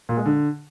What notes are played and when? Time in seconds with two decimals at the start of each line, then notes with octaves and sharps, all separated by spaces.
0.09 A#2
0.17 G#3
0.26 D3